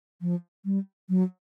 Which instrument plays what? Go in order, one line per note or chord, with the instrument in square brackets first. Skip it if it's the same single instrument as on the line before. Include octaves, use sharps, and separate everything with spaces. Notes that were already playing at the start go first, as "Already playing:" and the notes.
[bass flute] F3
G3
F#3